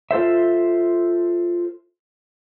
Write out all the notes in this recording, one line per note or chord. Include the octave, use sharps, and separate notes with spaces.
F4 A4 C5 E5